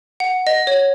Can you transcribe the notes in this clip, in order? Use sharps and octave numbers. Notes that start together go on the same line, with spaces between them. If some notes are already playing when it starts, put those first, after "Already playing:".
F#5
D#5
C#5